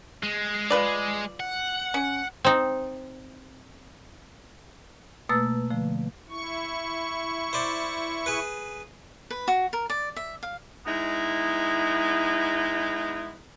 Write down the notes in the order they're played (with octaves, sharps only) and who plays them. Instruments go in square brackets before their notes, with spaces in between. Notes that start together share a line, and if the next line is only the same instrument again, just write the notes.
[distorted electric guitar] G#3
[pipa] F4 B4 D5
[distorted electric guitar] F#5
[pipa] C#4
[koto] C4 D#4
[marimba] B2 A3 A#3 B4 E6 A6
D3 F3 A3
[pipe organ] E4 C#6
[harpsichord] C5 D5
G#4 B4
[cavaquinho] B4
F#4
A#4
D5
E5
F5
[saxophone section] G#3 B3 D#4 E4